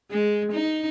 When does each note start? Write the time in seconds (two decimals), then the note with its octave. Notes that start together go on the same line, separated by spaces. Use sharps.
0.11 G#3
0.53 D#4